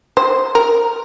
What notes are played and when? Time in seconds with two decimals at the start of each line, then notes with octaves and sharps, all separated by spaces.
0.17 C5
0.55 A#4